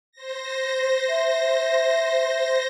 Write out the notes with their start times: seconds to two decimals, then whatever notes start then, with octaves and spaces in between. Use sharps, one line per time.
0.12 C5 A#6
1.09 E5